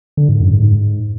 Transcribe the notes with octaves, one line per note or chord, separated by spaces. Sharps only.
D3
G#2
F#2
G#2
G#2